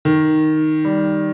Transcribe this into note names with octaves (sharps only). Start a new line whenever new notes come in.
D#3
G3